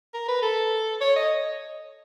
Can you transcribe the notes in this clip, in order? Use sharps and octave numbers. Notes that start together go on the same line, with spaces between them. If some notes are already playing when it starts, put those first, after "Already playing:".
A#4
B4
A4
C#5
D#5